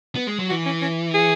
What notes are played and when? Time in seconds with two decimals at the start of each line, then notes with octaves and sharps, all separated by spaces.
0.15 B3
0.27 G#3
0.39 F#3
0.49 E3 F#4
0.66 C#4
0.82 C#4
1.14 G#4